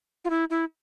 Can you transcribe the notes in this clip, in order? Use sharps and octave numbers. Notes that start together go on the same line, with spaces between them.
F4
E4
E4